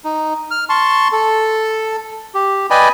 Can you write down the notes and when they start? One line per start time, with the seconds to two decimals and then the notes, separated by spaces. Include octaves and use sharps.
0.04 D#4
0.51 F6
0.69 A5 C6 C#6
1.12 A4
2.35 G4
2.70 B4 D5 D#5 G5 G#5 B5